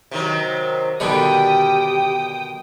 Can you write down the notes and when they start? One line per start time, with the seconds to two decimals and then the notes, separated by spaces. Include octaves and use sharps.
0.11 C3 D#3 F#3
1.00 B2 D3 D#3 G3 G4 G5 D#6